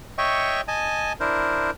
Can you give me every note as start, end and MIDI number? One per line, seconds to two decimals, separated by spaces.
0.18 0.61 73
0.18 0.61 75
0.18 0.61 76
0.18 0.61 79
0.18 0.61 85
0.68 1.13 75
0.68 1.13 80
0.68 1.13 81
1.20 1.71 62
1.20 1.71 64
1.20 1.71 70
1.20 1.71 72